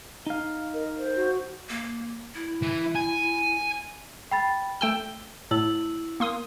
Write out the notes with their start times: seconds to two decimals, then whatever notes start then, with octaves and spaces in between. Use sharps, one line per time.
0.27 D#4 F5
0.74 A#4 D#5
0.98 C5
1.15 F#4
1.69 A#3
2.35 E4
2.63 E3
2.96 G#5
4.31 G5 B5 A6
4.81 A3 G5 E6 G7
5.51 A2 E4 E6 F#7
6.20 A#3 C6 D#6